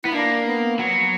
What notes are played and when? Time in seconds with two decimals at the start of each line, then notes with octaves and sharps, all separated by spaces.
0.04 B3 E4
0.12 A#3 D4
0.46 B3
0.79 F#3 B3